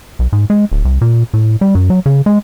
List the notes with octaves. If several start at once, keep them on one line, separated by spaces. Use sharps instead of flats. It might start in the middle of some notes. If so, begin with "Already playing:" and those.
B1
G#2
G#3
D1
C2
A#2
A2
G3
F#2
F#3
C#3
G#3